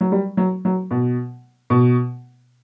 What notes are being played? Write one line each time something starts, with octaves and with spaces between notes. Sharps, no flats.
F#3
G3
F#3
F#3
B2
B2